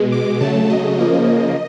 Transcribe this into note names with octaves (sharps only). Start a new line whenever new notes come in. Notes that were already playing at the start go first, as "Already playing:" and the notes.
Already playing: B2 G#3
D6
C#3 F#3 A3 A5
D#5
C#3 F3 A#3